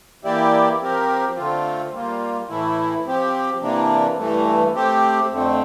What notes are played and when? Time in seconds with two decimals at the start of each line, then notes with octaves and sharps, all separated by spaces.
0.24 E3 A#3 E4 G4 D5
0.81 F3 C4 G4 A#4
1.37 D3 A3 C4 F4
1.92 G3 A#3 F4
2.49 A2 E3 A3 E4
3.06 F3 C4 G4
3.62 C3 E3 A#3 D4
4.18 G2 E3 A3
4.74 A3 C4 G4
5.31 F2 D3 A3 C4